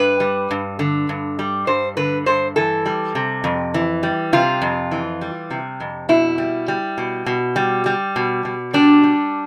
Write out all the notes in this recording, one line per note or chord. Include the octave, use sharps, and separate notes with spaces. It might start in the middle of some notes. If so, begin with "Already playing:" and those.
Already playing: G2 B4
G3
G2
D3
G2
G3
G2 C5
D3 B4
G2 C5
E3 A4
G3
C3
F2
E3
G3
C3 F4
F2
E3
G3
C3
F2
B2 E4
G3
G3
B2
B2
G3
G3
B2
B2
G3 D4
G3